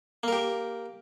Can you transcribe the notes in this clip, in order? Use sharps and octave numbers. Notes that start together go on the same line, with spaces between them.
A#3 G4 A#4